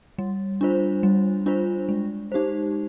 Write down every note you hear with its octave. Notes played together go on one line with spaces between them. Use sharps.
G3
D4 F4 C5
G3
D4 F4 C5
G#3
D#4 G4 C5